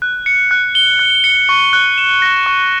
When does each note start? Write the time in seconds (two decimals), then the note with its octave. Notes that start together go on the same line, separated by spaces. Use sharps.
0.02 F#6
0.26 C#7
0.51 F#6
0.75 G7
0.99 F#6
1.24 C#7
1.49 C#6
1.73 F#6
1.98 E7
2.22 A#6
2.46 C#6